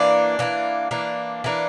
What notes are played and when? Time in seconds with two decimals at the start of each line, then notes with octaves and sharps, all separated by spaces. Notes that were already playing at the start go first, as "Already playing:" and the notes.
Already playing: E3 A#3 D4
0.39 E3 A#3 D4
0.91 E3 A#3 D4
1.44 E3 A#3 D4